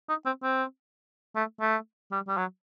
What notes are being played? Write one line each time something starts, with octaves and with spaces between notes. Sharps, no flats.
D#4
C4
C4
A3
A3
G3
G3
F#3